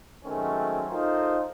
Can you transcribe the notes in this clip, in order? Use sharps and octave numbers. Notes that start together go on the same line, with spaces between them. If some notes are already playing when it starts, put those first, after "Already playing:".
D#3 F#3 G#3 A3 C4 C#4
C4 D#4 F4 A4 A#4 C5